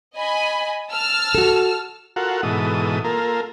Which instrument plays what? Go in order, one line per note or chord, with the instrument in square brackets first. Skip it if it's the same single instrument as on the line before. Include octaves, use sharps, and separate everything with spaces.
[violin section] D#5 G#5 B5
A5 E6 F6
[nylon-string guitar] F#4 A4
[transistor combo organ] F4 F#4 A4 A#4 F#5
G#2 B2 E3 A4 D#6
A#3 F4 A4 A#4